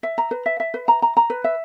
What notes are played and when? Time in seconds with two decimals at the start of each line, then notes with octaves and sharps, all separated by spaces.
0.03 E5
0.18 A#5
0.31 B4
0.46 E5
0.60 E5
0.74 B4
0.88 A#5
1.02 A#5
1.17 A#5
1.30 B4
1.44 E5